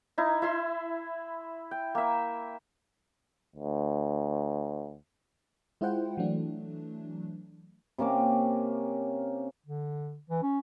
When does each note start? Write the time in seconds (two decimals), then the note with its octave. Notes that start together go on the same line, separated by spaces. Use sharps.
0.18 D#4 E4
0.42 E4 E5 C6
1.71 G5
1.95 A#3 E5
3.56 D2
5.81 G#3 E4 F4 C5 F#5 G5
6.17 E3 F#3 A3 D4
7.98 C3 A#3 C#4 D6
9.66 D3
10.30 E3
10.43 C#4